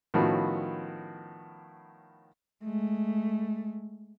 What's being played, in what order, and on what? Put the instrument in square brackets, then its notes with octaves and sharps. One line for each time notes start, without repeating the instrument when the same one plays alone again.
[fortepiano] A2 D#3 F3 B3 C#4 F#4
[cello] G#3 A3